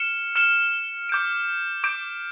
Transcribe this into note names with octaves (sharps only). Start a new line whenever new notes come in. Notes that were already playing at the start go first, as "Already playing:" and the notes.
Already playing: F6 C#7 E7 G7
F6 C#7 E7 G7
D6 G6 D7
D6 G6 D7